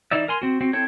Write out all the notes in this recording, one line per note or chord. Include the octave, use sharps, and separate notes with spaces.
E3 D#4 D5 E5
A#4 G#5 C6
C4 F#4
C4 F#4
C4 E4 A4 C#5 G5